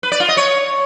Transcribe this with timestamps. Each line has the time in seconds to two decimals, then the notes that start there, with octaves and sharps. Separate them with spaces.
0.03 B4
0.12 D5
0.20 F4
0.29 D#5
0.37 C#5